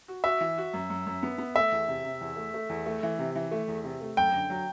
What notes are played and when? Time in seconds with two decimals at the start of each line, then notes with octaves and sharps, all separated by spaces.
0.08 F#4
0.24 F#4 E5
0.41 E3
0.58 F#4
0.74 F#2
0.90 F#2
1.07 F#2
1.23 B3
1.38 B3
1.55 A3 E5
1.72 E2
1.88 C3
2.04 C3
2.21 E2
2.36 A3
2.54 A3
2.69 E2
2.86 A3
3.03 E3
3.19 C3
3.35 E3
3.51 A3
3.68 E2
3.84 C3
4.01 A3
4.17 F#2 G5
4.33 D3
4.50 F#3